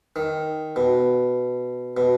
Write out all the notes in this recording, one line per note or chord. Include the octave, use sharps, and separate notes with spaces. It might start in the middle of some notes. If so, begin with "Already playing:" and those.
D#3
B2
B2